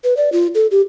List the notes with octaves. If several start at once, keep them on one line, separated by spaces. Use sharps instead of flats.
B4
D5
F4
A4
G4